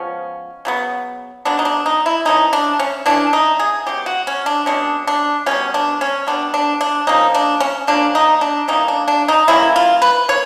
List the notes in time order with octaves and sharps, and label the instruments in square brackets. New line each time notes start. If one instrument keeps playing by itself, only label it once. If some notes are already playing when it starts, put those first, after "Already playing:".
Already playing: [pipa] F3 G#3 B3 C#4
C#3 F#3 B3
C#3 F#3 B3 D4
D#4
D4
D#4
E4
E3 A3 C#4 D#4
D4
C#4
E3 A3 C#4 D4
D#4
G#4
B2 G#3 C#4 G4
F#4
C#4
D4
B2 G#3 C#4 D4
D4
B2 G3 B3 C#4
D4
C#4
B2 G3 B3 D4
D4
D4
F3 A#3 C#4 D#4
D4
C#4
F3 A#3 C#4 D4
D#4
D4
E3 G3 A#3 C#4 D#4
D4
D4
D#4
E3 G3 A#3 C#4 E4
F4
B4
A#3 C#5